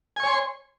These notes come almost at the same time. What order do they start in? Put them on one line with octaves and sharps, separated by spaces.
G#5 C#6 C#5 C6